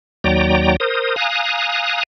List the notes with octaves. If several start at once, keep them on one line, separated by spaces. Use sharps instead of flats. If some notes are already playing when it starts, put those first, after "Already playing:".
D#2 F#3 D5 G5 A#5
A#4 C5 D#6
F5 G#5 A#5 D#6 F#6